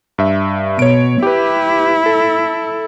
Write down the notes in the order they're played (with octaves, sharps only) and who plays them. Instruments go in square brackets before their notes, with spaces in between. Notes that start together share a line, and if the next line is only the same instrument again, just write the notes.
[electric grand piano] G2 E5
[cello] B2 [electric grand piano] C#5 D7
[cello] E4 [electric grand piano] G4 B4
[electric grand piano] A4